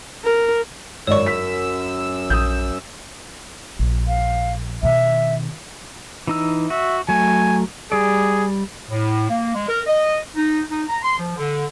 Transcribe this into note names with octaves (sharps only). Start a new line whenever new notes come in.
A#4
G#1 F#2 C#5 D5 C#6 E6
B6
A#1 D#6 G6
A#1
F5
B2 D#3 E5
E3 D#4 E6
F#4 E5
F#3 A3 G#5
G3 G#4 D5
A2
A#3
G#3
A#4
D#5
D#4
D#4
A#5
C6
F3
D3